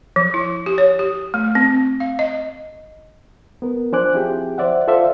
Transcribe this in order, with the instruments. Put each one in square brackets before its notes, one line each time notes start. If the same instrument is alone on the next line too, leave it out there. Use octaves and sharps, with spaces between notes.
[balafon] F3
E4
G4
C#5
G4
A3
C4
F5
D#5
[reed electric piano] B3 A#4
F3 D4 C5 G#5 D6 F#6
F3 C4 E4 G4 G#4 G5
C5 D5 E5 F#5
F4 A4 C5 D5 E5 F5